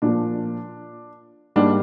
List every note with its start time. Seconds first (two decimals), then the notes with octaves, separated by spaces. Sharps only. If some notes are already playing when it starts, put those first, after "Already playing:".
0.02 A#2 F3 A#3 D4
1.56 G#2 G3 A#3 D4